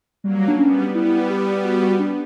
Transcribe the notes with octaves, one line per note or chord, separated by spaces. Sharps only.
F#3 G3 A#3
D4
G3 B3 C#4
G3 B3 E4
G4
F#4
F#4
D4